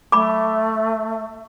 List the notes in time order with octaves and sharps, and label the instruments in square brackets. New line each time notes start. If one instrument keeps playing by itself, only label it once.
[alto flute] A3 [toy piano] B5 D6